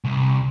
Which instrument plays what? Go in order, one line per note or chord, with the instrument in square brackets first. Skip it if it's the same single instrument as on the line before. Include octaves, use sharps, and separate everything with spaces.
[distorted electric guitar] C2